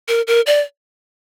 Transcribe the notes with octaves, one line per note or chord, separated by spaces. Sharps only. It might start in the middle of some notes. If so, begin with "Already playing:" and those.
A#4
A#4
D5